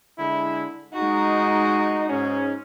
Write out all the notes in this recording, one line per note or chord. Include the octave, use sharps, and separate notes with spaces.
D3 G#3 E4
G#3 D#4 F#4
G#2 C#4